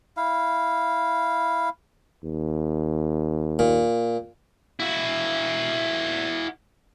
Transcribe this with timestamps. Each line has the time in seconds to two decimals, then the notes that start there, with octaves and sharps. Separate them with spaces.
0.17 E4 F5
2.24 D#2
3.59 A#2
4.80 E4 F#4